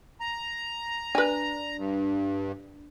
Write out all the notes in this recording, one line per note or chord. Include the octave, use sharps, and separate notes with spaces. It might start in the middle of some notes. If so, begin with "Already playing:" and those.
A#5
D4 B4 G#5
G2